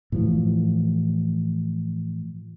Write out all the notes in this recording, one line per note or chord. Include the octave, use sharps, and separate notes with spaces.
A2 E3 F3